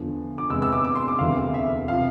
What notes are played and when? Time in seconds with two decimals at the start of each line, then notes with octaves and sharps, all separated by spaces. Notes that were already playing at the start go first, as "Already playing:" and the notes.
Already playing: E2 D3 F3
0.38 D6
0.50 E2 C3 G#3 B3 E6
0.62 E6
0.73 D6
0.85 D6
0.95 C6
1.08 D6
1.19 E1 D2 C3 E3 F5
1.54 E5
1.88 C3 F3 F5